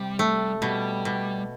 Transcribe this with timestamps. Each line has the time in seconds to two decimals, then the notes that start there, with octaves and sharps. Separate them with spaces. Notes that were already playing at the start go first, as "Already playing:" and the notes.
Already playing: C3 G3
0.19 A3
0.62 B2 G3
1.05 B2